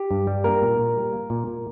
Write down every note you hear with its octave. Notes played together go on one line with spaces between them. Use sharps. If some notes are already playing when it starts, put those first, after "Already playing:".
Already playing: G4
G2
G3
A#3 A#4
A#2
A#2
G3
A#3
A#2
A#2